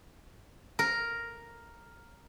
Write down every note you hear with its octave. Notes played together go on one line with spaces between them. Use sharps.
A#4